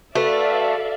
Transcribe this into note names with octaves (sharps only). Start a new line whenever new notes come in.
A3 F#4 B4 D5 E5 F5